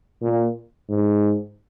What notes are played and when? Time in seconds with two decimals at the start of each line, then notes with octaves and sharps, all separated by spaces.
0.22 A#2
0.90 G#2